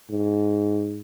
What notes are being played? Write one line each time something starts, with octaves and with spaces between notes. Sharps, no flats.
G#2